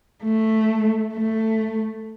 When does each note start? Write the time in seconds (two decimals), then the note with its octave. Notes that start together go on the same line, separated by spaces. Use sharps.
0.24 A3
1.15 A3